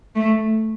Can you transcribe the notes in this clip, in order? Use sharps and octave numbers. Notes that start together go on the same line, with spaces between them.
A3